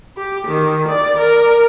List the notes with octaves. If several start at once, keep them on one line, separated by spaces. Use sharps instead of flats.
G4
D#3
D5
A#4